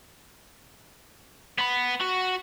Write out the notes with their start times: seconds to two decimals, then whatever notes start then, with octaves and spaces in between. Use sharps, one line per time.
1.58 B3 B5
2.01 F#4